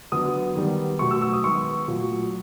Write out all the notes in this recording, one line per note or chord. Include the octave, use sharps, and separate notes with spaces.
D3 F#3 B3 D#6
D#3 G3 B3
B2 F#3 A3 C#6
E6
E6
D#6
D#3 G#3 B3 C#6
A#2 F#3 A3